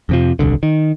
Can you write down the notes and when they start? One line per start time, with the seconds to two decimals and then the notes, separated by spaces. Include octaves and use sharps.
0.09 F2 C3 F3
0.39 D#1 C2 D3
0.63 D#3